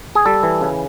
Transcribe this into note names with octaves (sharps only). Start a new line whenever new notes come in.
G#4
G3 A4
E3
C#3